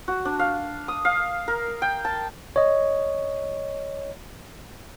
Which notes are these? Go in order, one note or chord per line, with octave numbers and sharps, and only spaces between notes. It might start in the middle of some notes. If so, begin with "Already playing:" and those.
F#4
D4
F5
D#6
F5
A#4
G5
A5
C#5 D#5